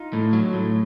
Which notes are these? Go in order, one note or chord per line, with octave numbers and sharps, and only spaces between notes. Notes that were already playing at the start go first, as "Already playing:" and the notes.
Already playing: D#4 F4
A2
F#3
A2